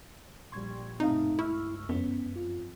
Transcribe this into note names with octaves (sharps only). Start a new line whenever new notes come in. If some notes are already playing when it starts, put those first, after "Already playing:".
A#1 G3 C6 C#6 G#6
G1 B2 A3 C4 D#4 D#5 F5
G1 C#2 E4 C#6 E6 F6
F#2 B3 C#4
F2 F4